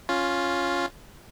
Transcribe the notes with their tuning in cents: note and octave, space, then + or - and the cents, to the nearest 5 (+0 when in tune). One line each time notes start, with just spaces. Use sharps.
C#4 +0 F4 +5